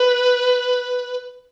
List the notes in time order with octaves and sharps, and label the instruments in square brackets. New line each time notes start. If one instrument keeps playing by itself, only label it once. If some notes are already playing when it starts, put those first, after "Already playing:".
Already playing: [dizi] B4